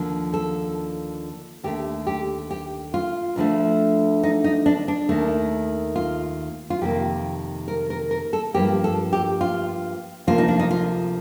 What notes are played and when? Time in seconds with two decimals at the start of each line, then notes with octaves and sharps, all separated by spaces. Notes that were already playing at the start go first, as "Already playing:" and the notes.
Already playing: D#2 D3 F3
0.34 A4
1.64 D#2 D3 A3 G4
2.07 G4
2.51 G4
2.94 F4
3.36 D2 D3 F3 A3
4.23 D#4
4.44 D#4
4.66 D4
4.88 D4
5.09 D#2 D#3 A3
5.96 F4
6.70 F4
6.81 F2 C3 D#3 G3 A#3 G4
7.68 A#4
7.90 A#4
8.11 A#4
8.33 A4
8.54 G2 F3 A#3 G4
8.84 A4
9.13 G4
9.41 F4
10.27 D2 C3 F3 A#3 F4
10.38 D#4
10.48 D4
10.59 D#4
10.71 F4